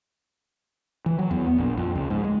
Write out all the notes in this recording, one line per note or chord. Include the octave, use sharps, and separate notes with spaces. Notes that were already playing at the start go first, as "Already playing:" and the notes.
E3
F#3
E2
B3
A#1
F2
C#2
G#2
G#3